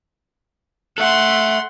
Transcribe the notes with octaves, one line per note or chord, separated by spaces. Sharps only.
A4 E5 F#5 C6